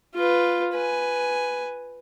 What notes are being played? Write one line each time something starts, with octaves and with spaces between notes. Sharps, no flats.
F4 B4
B4 G#5